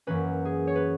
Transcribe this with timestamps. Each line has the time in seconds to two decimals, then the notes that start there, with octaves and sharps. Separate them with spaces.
0.07 F#2 E3 A#3 C#4 B4
0.45 G#4
0.67 C#5
0.75 B4